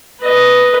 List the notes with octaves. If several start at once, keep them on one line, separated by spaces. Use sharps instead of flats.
B4 D#5